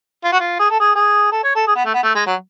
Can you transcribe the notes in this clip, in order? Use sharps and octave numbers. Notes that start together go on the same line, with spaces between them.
F4
F#4
F4
G#4
A4
G#4
G#4
A4
C#5
A4
G#4
B3
A3
B3
A3
G#3
F#3